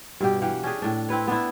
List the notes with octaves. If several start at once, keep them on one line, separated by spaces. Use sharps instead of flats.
G2 B2 G4
E3 G4 F5 F#5
C#4 D4 G4 G#4
A2 D4
C4 E4 B4 C#5
B3 D4 E4